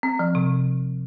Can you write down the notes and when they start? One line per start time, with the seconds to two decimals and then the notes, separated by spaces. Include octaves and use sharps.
0.03 C4
0.19 F3
0.35 C3